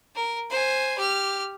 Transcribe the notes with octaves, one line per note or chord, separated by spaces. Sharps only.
A#4
C5 G#5
G4 F6